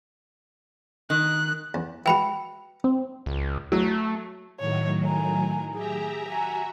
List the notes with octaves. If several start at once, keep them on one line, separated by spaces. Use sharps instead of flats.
D#3 F#6
E2
E3 G#3 F#4 G5 B5 C#7
C4
C#2
F#3 A3
A2 D#3 F#3 C#5
G#5 A#5
G4 G#4 E5 A#5
F#4 E5 G#5 A#5